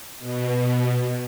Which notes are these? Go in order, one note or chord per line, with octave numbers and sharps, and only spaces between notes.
B2